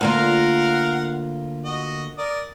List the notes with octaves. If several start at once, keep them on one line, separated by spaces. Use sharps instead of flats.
D2 A#3 F4 A#4 F5 F#5
F#4 D#5
A#4 D5 D#6